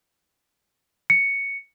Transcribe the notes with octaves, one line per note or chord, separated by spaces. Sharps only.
C#7